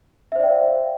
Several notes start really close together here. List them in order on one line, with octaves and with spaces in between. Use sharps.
E5 C5 D5 G5 F5